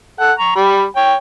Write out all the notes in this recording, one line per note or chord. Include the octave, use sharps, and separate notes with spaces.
A4 F#5
A#5 C#6
G3 B5
C#5 G5